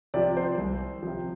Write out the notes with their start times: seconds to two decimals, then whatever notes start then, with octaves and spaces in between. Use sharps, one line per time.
0.14 C3 F3 D5
0.37 C5
0.58 C2
1.03 C3 F3